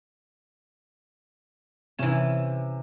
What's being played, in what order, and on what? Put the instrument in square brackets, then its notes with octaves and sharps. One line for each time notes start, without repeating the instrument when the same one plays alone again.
[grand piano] C3 E7 [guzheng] E3 C#4